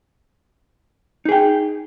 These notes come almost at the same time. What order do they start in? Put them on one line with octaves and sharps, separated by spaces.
D#4 G#4 G5